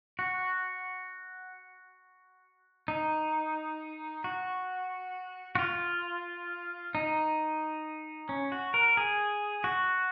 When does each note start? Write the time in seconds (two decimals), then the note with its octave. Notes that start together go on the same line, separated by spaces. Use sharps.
0.19 F#4
2.88 D#4
4.24 F#4
5.55 F#4
5.59 F4
6.95 D#4
8.29 C#4
8.52 F#4
8.74 A#4
8.97 G#4
9.64 F#4